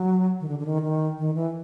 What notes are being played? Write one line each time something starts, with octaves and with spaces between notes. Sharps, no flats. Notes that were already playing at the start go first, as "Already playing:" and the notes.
Already playing: F#3
D#3
D3
D3
D#3
D#3
D#3
E3